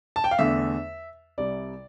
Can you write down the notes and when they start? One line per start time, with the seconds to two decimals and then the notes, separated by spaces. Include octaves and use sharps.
0.16 A5
0.24 G5
0.31 F5
0.38 E2 D3 A3 E5
1.38 C2 C3 G3 D5